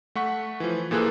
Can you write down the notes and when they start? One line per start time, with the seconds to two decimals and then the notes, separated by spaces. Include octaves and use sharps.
0.15 A3 F#5 C#6 B6
0.60 E3 F3
0.91 A#2 E3 A#3 G#4 A4 F#6